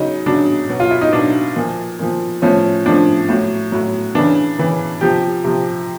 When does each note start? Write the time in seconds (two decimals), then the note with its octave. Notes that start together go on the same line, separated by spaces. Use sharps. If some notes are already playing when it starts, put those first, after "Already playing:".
Already playing: C#3 F#3 D#4
0.26 C#3 F#3 D4
0.69 B2 F#3
0.80 F4
0.91 E4
1.01 D#4
1.12 B2 F#3 D4
1.56 A#2 F3
1.99 A#2 F3
2.42 A2 F3 C#4
2.85 A2 F3 D4
3.29 A2 F#3
3.72 A2 F#3
4.15 C#3 E3 D4
4.58 C#3 E3
5.01 C3 F3 G4
5.45 C3 F3